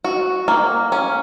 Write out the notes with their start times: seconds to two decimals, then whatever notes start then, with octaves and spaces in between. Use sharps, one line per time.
0.04 F#4
0.48 A#3
0.92 C#4